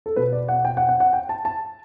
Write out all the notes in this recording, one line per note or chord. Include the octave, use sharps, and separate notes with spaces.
A4
B2 B4
D5
F#5
G5
F#5
F#5
F#5
G5
A5
A5